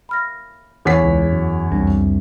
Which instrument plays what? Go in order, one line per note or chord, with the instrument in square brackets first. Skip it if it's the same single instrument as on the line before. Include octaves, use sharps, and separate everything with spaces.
[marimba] B5 F6 A#6
[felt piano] E2 C#5 B6
[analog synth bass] C#2
F#2
[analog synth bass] C2 [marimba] F2 G3 D4